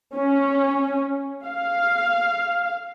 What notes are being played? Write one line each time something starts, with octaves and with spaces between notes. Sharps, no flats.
C#4
F5